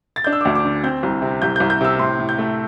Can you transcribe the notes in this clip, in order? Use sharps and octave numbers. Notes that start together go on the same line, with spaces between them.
A6
D4 G6
E6
D6
D2
D6
D3
C4 G6
C2
C3
C2 G6
G6
C2
G6
C3 E6
A2 C6
A2
G6
A3